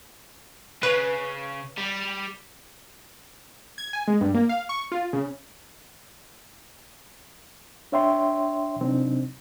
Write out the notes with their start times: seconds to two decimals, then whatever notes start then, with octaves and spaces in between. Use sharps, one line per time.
0.83 C#3 B4
1.78 G3
3.78 G#6
3.93 G#5
4.08 G#3
4.21 G2
4.34 A#3
4.49 F5
4.69 C#6
4.92 F4
5.13 C#3
7.92 D4 C#5 E5 G5 C6
8.81 C3 F#3 C4 D4 D#4